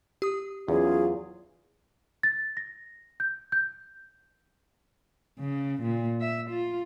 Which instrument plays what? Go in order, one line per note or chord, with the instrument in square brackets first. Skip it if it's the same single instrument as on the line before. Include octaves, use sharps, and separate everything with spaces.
[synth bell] G4 D#6
[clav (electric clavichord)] E2 [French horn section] F#3 C#4 F4 [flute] G#4
[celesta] A6
A#6
G6
G6
[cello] C#3
A#2
E5
F4